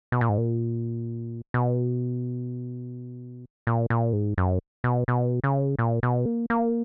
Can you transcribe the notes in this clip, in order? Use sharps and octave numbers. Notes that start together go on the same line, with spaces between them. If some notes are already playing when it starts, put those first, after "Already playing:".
B2
A#2
G#2
A#2
B2
A#2
A#2
G#2
F#2
B2
B2
C#3
A#2
B2
A#3
A#3